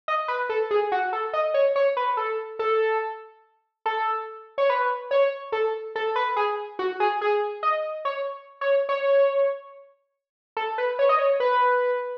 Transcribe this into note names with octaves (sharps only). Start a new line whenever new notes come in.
D#5
B4
A4
G#4
F#4
A4
D#5
C#5
C#5
B4
A4
A4
A4
C#5
B4
C#5
A4
A4
B4
G#4
F#4
G#4
G#4
D#5
C#5
C#5
C#5
A4
B4
C#5
D#5
C#5
B4